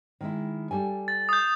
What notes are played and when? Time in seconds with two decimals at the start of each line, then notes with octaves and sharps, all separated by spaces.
0.21 D#3 G#3 E4
0.71 G3 A4 G#5
1.08 A6
1.29 D#6 G6